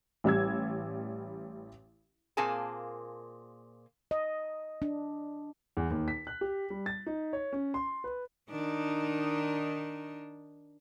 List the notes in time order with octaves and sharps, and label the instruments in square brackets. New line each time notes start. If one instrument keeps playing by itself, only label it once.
[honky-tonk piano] A1 G3 E6 G#6
[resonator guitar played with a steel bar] A#2 A#3 C4 G#4 G#5 A5
[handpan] D#5
D4
[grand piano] E2
D#2
B6
F#6
G4
G3
A6
D#4
C#5
C#4
C6
B4
[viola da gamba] D#3 D4 D#4